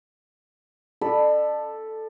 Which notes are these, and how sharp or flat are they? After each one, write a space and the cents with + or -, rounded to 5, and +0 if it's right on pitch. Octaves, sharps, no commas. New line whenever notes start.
A4 +0 D5 +40 B5 +0